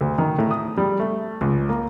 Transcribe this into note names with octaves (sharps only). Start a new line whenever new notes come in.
D2
D#3
A2
D#6
G3
A3
C#2
A#3